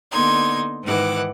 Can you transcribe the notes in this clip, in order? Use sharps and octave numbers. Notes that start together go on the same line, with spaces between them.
D3 A#3 B3 D#4 C6 G#6
G#2 D#3 E3 F#5 D6